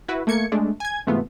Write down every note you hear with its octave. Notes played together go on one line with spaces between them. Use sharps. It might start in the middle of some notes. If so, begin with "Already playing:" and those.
E4 F#4 B4
A3 A#3 G#6 C#7
G#3 A3 D4
G#5 G#6
G#2 C3 E3 A3 B3 F4